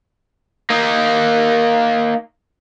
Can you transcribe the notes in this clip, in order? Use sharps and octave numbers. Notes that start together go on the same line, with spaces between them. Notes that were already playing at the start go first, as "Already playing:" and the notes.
A#3 D#4